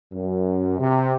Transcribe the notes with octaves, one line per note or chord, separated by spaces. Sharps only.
F#2
C3